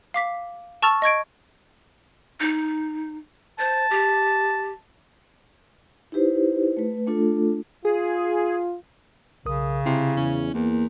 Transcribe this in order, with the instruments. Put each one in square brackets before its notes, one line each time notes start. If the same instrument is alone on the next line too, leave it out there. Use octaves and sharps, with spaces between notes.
[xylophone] F5 D6 B6
A5 C#6 E6 F6 A6 F7
D#5 C#6 G#6 D7
[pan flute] D#4
[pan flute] C5 [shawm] A5
[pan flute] G4
[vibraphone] D#4 E4 G4 B4 C5
A3 B4
A3 D4 F4 A4
[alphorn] F4 [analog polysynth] G#4
[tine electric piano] B1 A#4 D#6 [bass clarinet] C#3
[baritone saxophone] C3 [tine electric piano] E4
[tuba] E2 [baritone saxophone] C#4
[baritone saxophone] E2 [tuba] A#3